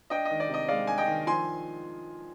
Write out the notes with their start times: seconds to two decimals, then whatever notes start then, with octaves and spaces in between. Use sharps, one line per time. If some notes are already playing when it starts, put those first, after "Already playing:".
0.10 D4 D#5 G5
0.25 D#3 D#5
0.40 D5
0.49 C3 D#5
0.68 G#3 D5 F5
0.87 D4 G#5
0.98 D#5 G5
1.07 D#3
1.27 F3 G#5 C6